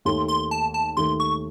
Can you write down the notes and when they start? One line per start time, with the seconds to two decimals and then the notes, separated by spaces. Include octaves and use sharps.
0.05 D#2 D#3 A3 C6
0.28 C6
0.51 A5
0.74 A5
0.97 D#2 D#3 A3 C6
1.20 C#6